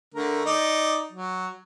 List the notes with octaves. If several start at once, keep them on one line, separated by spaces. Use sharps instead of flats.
D3 A3 A#4
D#4 D5
F#3